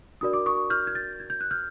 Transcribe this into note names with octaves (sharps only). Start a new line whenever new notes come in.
D4 F#4 A#4 D5 D#6
D6
C#6 D#6
F6 G6
G#6
G6 A6
G#6
G6
F#6
F6 G6